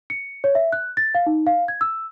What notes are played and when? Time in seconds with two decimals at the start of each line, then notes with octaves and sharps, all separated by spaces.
0.10 C#7
0.44 C#5
0.55 E5
0.72 F#6
0.97 A6
1.15 F5
1.27 D#4
1.47 F5
1.68 G#6
1.81 E6